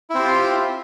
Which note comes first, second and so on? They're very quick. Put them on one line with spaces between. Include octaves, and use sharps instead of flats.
E4 C4 G4 F4